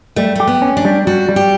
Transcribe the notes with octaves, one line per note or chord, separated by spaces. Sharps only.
G3 A3
A3 G4
B3
C#4
D4
G3
G3 F#4
G3
G4